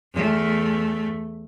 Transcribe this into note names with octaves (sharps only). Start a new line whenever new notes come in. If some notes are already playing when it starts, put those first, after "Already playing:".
E2 A3